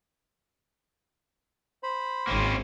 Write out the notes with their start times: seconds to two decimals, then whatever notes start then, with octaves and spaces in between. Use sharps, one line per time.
1.83 C5 B5
2.27 G#1 A#3 C4 C#4